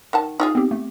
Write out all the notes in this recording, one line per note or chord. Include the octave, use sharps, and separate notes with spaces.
D#3 F#5 A5
D#4 F4 G#4
B3 C4 G4
A3